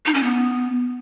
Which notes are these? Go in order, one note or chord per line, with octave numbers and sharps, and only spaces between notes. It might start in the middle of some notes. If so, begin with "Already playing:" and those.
D#4
C#4
B3